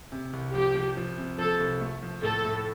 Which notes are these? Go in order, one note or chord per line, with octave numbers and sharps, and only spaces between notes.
C3
C2
F3 G4
F3
F3
C3
F3 A4
C2
A3
F3
A2 A4
A2